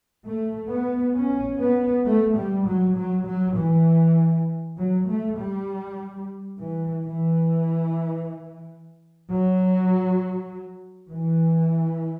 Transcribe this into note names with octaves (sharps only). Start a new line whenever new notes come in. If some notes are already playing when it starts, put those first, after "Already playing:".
A3
B3
C#4
B3
A3
G3
F#3
F#3
F#3
E3
F#3
A3
G3
E3
E3
F#3
E3